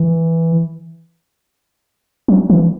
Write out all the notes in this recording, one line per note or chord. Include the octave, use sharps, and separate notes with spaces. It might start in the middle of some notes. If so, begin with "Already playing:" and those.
Already playing: E3
F#3
E3